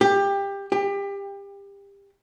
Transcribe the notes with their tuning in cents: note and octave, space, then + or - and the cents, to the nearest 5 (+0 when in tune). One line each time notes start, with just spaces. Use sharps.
G4 +20
G4 +25